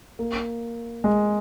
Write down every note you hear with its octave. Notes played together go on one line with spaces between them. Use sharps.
A#3
G#3